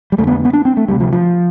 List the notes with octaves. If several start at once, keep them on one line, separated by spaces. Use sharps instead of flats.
G3
F2 D3 A3
B3
B3
D4
C4
A3
D2 C3 G3
F3
F3